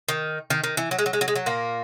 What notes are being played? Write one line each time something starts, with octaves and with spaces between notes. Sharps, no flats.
D#3
D#3
D#3
E3
F#3
G#3
F#3
G#3
F#3
G#3
F#3
A#2 A#3